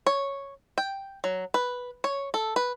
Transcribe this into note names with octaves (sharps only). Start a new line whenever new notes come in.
C#5
G5
F#3
B4
C#5
A4
B4